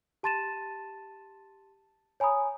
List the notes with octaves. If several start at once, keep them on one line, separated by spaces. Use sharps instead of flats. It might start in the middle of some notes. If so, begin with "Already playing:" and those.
G4 A5 C6 A6 D#7 E7
C#5 G#5 A#5 B5 D#6